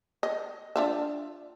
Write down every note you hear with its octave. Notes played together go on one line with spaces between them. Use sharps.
D#5
D4 F4 E5